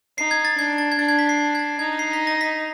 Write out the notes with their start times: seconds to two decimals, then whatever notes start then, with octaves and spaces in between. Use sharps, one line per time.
0.18 D#4 C7
0.31 G#6
0.45 A6
0.58 D4 G#6
0.78 A6
0.92 G#6
0.99 D4 A6
1.09 G#6
1.19 B6
1.29 C7
1.55 G#6
1.59 A6
1.79 D#4 G#6
1.99 C7
2.13 B6
2.27 A#6
2.41 B6